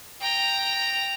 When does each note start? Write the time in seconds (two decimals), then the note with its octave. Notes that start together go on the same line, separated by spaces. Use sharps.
0.20 G5 A#5